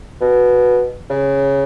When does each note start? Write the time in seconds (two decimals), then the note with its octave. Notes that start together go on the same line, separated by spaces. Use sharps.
0.21 B2
1.10 C#3